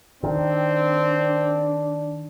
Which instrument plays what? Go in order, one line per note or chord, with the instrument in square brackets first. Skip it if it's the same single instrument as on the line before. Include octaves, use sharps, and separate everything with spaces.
[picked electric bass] D#3 [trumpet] C4 [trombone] D4